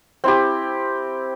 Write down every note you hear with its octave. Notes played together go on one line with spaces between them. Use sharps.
C4 E4 G4